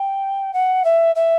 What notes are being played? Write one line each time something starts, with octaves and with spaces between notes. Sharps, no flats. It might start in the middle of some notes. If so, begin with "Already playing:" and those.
Already playing: G5
F#5
E5
E5